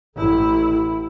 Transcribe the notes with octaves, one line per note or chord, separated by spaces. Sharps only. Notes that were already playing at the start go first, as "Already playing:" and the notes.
A1 E4